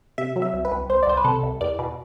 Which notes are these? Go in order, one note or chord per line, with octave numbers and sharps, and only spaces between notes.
C3 E5
F#3
E5
C2
B4
C2
C2 C5
D5
C2 C5
B4
C3 A4
C2
E2 D5
B2